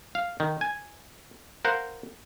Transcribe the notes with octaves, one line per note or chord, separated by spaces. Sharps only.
F5
D#3
G#5
A#4 C5 F5 F#5